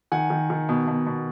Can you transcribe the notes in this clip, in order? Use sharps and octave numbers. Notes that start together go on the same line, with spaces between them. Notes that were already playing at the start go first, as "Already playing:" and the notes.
D#3 F#5 G#5
D#3
D#3
B2
B2
B2